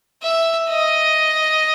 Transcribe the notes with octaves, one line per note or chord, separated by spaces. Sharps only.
E5
D#5